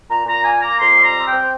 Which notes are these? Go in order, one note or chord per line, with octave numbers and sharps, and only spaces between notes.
A#2 A#5
A#2 A#5
A#3 G#5
A#3 A#5
F2 C6
G3
A#5
C4
G5
C4